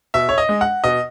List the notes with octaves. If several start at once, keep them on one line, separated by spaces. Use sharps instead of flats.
B2 E5
C#5
D#5
G#3
F#5
B2 D#5